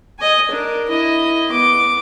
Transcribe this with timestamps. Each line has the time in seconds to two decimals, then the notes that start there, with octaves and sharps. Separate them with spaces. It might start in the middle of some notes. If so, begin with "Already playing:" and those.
0.19 D#5 G#5
0.51 D4 A#4
0.89 E4 D#5
1.51 B3 D6